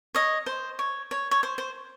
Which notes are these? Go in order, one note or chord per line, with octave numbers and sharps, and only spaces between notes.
C#5 D#5
C5
C#5
C#5
C#5
C5
C5